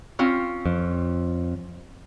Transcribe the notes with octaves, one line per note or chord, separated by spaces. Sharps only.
C4 C#4 F4
F2